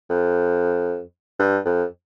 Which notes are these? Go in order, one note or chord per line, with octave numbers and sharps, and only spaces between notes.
F2
G2
F2